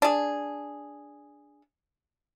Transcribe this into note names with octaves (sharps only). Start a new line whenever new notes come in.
D4 G#4